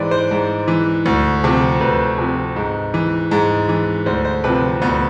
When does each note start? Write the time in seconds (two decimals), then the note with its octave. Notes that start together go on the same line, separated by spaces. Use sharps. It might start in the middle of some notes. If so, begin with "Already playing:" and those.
Already playing: G#2 E3 B4 C5 D5
0.11 C5
0.31 G#2
0.68 E3
1.06 D2
1.44 C3 F3
1.81 D2 B4
2.18 C3 F3
2.56 G#2
2.94 E3
3.31 G#2
3.69 E3
4.06 D2 C5
4.25 C5
4.44 C3 F3 B4
4.82 D2 B3